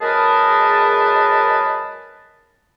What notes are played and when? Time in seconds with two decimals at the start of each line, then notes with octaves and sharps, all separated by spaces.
0.01 F#2 G#3 G#4 A#4 B4 A5